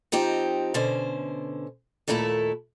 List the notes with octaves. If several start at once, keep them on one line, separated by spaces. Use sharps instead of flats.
F3 C4 D#4 G4
B2 D3 C#4 C5
D#2 A#2 A3 E4 A4